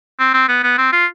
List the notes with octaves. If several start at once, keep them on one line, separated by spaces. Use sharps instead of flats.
C4
C4
B3
B3
C4
F4